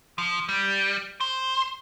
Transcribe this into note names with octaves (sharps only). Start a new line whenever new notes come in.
F3
G3
C5